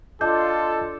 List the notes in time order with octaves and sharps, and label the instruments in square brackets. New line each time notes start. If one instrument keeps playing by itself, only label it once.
[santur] D4 [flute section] F4 [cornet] A4 [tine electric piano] D#5 G6